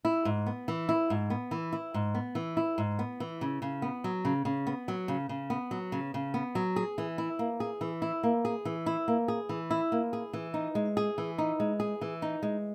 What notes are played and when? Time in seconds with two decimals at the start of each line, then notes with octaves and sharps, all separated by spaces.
0.05 E4
0.25 G#2
0.46 B3
0.68 E3
0.89 E4
1.10 G#2
1.30 B3
1.51 E3
1.73 E4
1.94 G#2
2.15 B3
2.35 E3
2.57 E4
2.78 G#2
2.99 B3
3.20 E3
3.41 C#3
3.62 C#3
3.82 B3
4.04 F#3
4.25 C#3
4.45 C#3
4.67 B3
4.88 F#3
5.08 C#3
5.29 C#3
5.50 B3
5.71 F#3
5.92 C#3
6.14 C#3
6.34 B3
6.55 F#3
6.76 G#4
6.98 E3
7.18 E4
7.39 A#3
7.60 G#4
7.81 E3
8.02 E4
8.23 A#3
8.45 G#4
8.65 E3
8.86 E4
9.08 A#3
9.28 G#4
9.49 E3
9.70 E4
9.92 A#3
10.13 G#4
10.33 E3
10.54 D#4
10.75 G#3
10.97 G#4
11.18 E3
11.38 D#4
11.60 G#3
11.80 G#4
12.01 E3
12.22 D#4
12.43 G#3